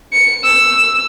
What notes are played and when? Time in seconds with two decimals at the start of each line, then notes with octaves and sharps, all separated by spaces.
0.13 C#7
0.45 E6